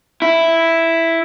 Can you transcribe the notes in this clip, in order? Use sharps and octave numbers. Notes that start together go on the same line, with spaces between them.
E4